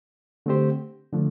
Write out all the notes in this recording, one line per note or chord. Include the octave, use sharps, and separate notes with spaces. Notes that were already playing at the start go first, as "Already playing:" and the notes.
D3 A3 C4 G4 C5
D3 F3 A3